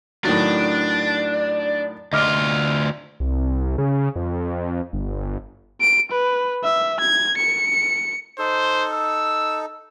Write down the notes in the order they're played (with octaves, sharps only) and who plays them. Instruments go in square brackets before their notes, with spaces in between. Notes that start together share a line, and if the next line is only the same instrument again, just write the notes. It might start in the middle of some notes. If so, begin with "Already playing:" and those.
[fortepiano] A2 D#3 F#3 [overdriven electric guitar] D4
[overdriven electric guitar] D2 F4 [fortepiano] D#5 D6 F6
[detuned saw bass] C2
C#3
F2
G1
[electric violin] D7
B4
E5
G#6
C#7
[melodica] D#4 A4 [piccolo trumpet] C5
[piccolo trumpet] E6